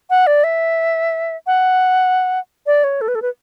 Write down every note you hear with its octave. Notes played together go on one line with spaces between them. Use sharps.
F#5
D5
E5
F#5
D5
C#5
A4
B4
A4
B4